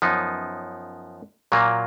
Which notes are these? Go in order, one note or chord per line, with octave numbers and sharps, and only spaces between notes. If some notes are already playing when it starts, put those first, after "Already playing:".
F#2 F3 B3 D#4
A#2 F#3 A#3 F4